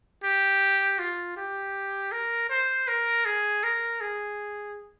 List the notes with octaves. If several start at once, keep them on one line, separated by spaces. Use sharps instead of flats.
G4
F4
G4
A#4
C5
A#4
G#4
A#4
G#4